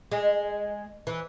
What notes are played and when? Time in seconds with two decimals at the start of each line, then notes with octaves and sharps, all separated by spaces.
0.12 G#3
1.07 E3